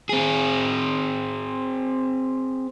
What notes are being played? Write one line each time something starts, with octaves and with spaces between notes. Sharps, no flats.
C4 G#4